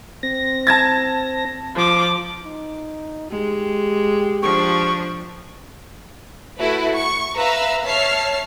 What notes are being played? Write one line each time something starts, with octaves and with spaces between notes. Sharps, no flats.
C4 A#6
A5 G#6 A6
F3 D6
D#4
G#3 G4
F3 D4 C#6
A3 E4 F#4 B4
C#6
B4 E5 F5 A#5 E6
C#5 E5 A5 F6 C7